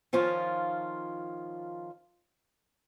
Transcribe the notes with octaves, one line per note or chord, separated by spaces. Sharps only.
D#3 F3 C#4 F4